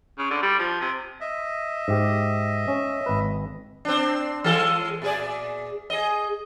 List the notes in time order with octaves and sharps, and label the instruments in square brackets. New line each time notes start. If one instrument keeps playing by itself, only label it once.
[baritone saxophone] C#3
D3
G3
F3
C3
[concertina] D#5 E5
[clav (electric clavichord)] G#2 G4
C#4
G#1 B4
[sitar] C4 D4
E3 G#3 A4
A#2 G#4 D5
G#4 D#5